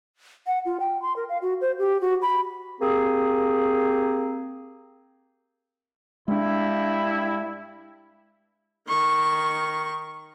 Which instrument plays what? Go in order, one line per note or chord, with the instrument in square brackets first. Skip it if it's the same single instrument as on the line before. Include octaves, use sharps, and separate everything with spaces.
[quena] F#5
F4
G5
C6
A#4
F5
F#4
C5
G4
F#4
B5
[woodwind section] A#3 C4 G4 G#4
[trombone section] G2 E4 [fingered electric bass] G#3 D4
[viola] D#3 C#6